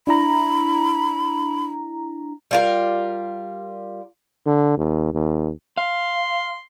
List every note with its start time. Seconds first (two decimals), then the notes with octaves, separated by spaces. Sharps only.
0.07 D4 E4 A#5 B5
2.51 G3 F4 A#4
4.46 D3
4.77 D#2
5.14 D#2
5.78 F5 C6